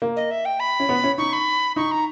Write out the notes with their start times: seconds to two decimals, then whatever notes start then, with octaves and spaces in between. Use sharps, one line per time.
0.02 A#3
0.16 D#5
0.31 E5
0.45 G5
0.60 B5
0.80 C#4
0.89 B3
1.04 C#4
1.18 D#4 C#6
1.33 B5
1.76 D#4 C#6
1.91 A#5